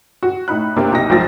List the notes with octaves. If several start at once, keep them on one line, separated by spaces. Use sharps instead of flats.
F#4
A2 D#4 B5 F#6
A2 C3 A#3 D4
B1 D#4 G4 A#6
B1 G#2 F3 A6 A#6